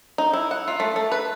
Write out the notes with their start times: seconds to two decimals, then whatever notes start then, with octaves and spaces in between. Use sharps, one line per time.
0.18 D#4
0.33 E4
0.51 F#5
0.68 F4
0.80 A3
0.96 A3
1.12 B4